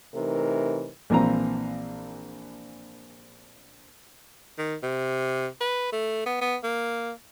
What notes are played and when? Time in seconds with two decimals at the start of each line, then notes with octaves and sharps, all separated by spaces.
0.15 C3 E3 A3 D#4 A#4
1.10 A#1 E3 A#3 C4 A#5
4.58 D#3
4.83 C3
5.61 B4
5.92 A3
6.26 B3
6.41 B3
6.63 A#3